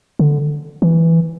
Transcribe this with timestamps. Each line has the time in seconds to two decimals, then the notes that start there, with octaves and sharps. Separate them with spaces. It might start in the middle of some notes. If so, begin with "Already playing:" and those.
0.19 D3
0.82 E3